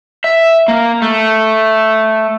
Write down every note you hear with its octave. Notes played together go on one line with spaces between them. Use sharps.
E5
A#3
A3